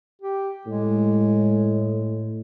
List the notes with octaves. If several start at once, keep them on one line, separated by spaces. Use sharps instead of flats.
G4
A2 G#3